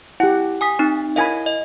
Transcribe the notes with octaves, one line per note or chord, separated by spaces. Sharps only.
E4 G4 F#5
G#5 D#6 B6
C4 D#4
E4 A#4 D#5 F5 G#5 B5
D#5